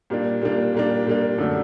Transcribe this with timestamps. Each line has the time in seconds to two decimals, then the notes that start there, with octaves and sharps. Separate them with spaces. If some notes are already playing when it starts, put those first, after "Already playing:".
0.10 A#2 G3 A#3 D4
0.42 A#2 G3 A#3 D4
0.74 A#2 G3 A#3 D4
1.07 A#2 G3 A#3 D4
1.38 F#2 D3 A3 D4